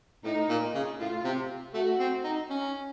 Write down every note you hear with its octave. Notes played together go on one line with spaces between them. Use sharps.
A2 D#4
A#2
C#3
A2 F4
C3
A3 F#4
C4
D#4
C#4